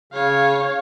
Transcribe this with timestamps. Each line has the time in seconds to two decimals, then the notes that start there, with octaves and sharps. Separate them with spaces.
0.13 C#3 C#5 F5